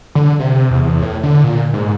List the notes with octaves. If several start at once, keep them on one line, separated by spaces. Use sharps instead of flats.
D3
C3
E2
A2
D3
A#2
G#2